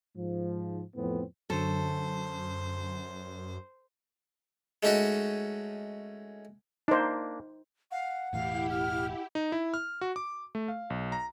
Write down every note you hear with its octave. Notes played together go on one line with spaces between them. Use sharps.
G#2 F3
F2 A2 B3 C4
F#2 D3 F#3 A4 C5
G#3 A3 C#4 D#4 F#4
A#3 D4 D#4 C5
F5 F#5
E1 A2 E3 E4 G4 F5
F6
D#4
E4
F6
F#4
D6
A3
F5
B1
A#5